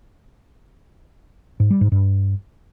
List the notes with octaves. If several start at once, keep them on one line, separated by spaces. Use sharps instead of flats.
G#2
G3
G#2
G2